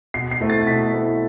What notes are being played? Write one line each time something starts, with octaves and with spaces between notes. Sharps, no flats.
B2 C7
C7
A3 C4 E4
A6
B2 B6
A3 C4 E4